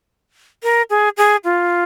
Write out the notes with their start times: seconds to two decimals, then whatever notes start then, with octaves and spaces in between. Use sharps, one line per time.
0.63 A#4
0.90 G#4
1.17 G#4
1.44 F4